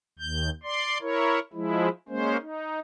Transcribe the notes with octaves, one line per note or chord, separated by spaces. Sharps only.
D#2 G6
D5 C6
E4 A#4 C#5
F3 G#3 E4
G#3 A#3 C#4 C5
D#4